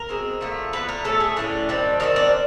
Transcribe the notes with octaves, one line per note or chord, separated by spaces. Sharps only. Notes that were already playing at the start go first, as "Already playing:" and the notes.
Already playing: A#4
B2 G#3 C4
D3 F3 A3
D3 F3 A3 B4
A#4
A2 E3 A3 C#4 A4
G#4
A2 E3 A3 C#4 D4
D#3 G3 C4
D#3 G3 C4 C#4
D4